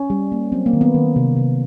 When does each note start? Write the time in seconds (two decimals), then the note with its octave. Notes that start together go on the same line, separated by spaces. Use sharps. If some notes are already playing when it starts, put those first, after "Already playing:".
Already playing: C#4
0.10 G3
0.32 A#3
0.52 F#3 C4
0.66 A#3
0.73 D#3
0.81 B3
0.94 D#3
1.16 C3
1.37 C3